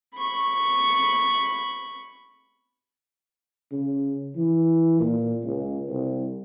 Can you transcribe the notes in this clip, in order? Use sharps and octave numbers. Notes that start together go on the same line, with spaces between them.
B5 C#6
C#3
E3
A#2
C#2
C2